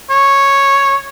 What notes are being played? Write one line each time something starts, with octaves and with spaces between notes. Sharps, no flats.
C#5